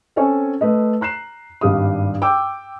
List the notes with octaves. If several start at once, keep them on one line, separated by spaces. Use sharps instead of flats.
C4 C#4 A4 C#5 G#5
A3 B4 D#5
A#5 F#6 C7 E7
G#1 G2 G3 F5 D#6
G5 D6 E6